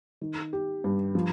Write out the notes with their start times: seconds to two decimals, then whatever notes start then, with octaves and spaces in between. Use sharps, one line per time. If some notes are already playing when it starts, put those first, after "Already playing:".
0.21 D#3
0.53 G4
0.84 G2
1.15 F3